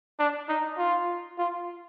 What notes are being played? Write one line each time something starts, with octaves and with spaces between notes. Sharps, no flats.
D4
D#4
F4
F4